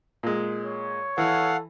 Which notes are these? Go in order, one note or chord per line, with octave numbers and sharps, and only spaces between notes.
A#2 G#3
C#5
E3 A4 F5 F#5